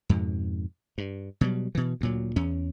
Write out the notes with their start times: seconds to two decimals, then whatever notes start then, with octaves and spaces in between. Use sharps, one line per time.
0.09 F2 G#2 B2
0.98 G2
1.41 B2 F#3 G3
1.75 B2 E3
2.01 D2 A#2 F#3
2.36 E2 C#4